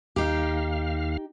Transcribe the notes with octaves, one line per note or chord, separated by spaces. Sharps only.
D#2 D#4 G4 F5